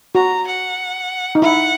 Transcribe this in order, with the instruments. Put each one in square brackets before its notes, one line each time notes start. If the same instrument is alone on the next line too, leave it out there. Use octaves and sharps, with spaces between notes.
[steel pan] F#4 [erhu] A#5
[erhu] F#5
[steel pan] D#4
[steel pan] E4 [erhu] F#5